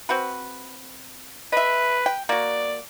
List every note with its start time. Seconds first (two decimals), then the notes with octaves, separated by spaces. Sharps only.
0.09 C4 F#4 B4
1.52 B4 D#5 E5
2.06 G5
2.29 A#3 F#4 D5